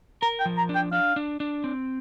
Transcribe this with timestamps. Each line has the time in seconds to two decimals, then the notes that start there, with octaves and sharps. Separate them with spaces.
0.22 A#4 A#5
0.40 G5
0.46 F3
0.58 A#5
0.69 D4
0.75 G5
0.92 D4 F5
1.16 D4
1.40 D4
1.64 C4